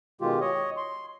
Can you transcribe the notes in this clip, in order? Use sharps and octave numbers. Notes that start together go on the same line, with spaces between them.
B2 D#3 G#3 F4 G4
C#5 D#5
C6